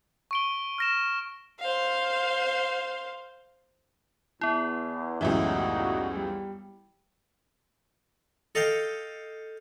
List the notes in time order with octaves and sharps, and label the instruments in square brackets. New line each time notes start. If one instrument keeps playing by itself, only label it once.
[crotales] C#6 D7 G7
F6 A#6 E7
[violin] C5 F5
[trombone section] E2 [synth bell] B3 E4
[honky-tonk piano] C#2 F#2 E3 [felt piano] A2 E5 [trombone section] G3 D#4 F#4
[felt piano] G3
[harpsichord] A4 D#5 F5 G5